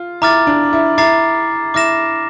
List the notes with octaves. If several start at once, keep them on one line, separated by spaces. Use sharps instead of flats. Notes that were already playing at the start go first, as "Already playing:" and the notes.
Already playing: F4
E4 A#5 D6 F6 A6
D4
E4
E4 A#5 D6 A6 C7
E4 D6 F6 A#6 E7